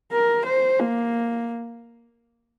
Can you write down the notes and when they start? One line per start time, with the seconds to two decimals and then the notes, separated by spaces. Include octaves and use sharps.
0.12 A#4
0.45 C5
0.79 A#3